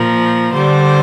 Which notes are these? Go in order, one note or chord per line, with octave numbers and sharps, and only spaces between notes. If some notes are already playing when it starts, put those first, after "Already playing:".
Already playing: A#2 F3 A#4
D3 G3 C5